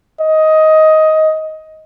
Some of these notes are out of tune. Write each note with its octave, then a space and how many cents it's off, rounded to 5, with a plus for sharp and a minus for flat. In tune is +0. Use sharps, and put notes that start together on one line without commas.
D#5 +15